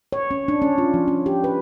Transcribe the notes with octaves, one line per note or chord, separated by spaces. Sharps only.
C#5
C#4
D4
C#4
F4
F3
C#4
G4
B4